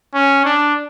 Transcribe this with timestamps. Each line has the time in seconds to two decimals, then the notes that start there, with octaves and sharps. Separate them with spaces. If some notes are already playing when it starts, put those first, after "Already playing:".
0.14 C#4
0.45 D4